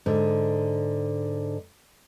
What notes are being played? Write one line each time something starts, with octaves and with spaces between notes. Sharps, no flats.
G#2 D3